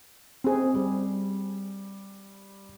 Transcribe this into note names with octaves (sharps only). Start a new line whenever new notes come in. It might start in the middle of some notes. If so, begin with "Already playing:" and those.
C4 G#4
G3